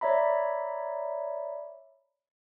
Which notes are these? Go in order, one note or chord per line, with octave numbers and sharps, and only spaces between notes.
C#5 D5 E5 A#5 B5